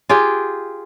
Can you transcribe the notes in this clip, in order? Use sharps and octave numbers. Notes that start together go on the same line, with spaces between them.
F4 G4 G#4 G5